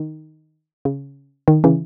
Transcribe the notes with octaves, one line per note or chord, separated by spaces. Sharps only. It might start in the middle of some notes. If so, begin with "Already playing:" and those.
Already playing: D#3
C#3
D#3
C#3 E3